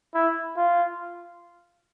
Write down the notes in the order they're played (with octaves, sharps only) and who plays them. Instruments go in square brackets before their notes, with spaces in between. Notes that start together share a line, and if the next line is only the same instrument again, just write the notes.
[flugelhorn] E4
F4